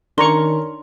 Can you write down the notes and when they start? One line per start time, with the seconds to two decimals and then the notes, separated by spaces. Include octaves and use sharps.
0.18 D#3 C#4 D4 A#4 A#5 C6 C#6